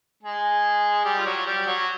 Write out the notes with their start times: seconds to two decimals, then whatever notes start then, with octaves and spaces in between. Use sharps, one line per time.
0.23 G#3 G#4
1.05 G3 G4
1.18 F4
1.25 F#3 F#4
1.46 G3 G4
1.66 F#3 F#4